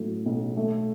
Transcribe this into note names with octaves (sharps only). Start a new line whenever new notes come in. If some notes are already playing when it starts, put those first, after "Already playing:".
Already playing: A2 F#3
B1
A3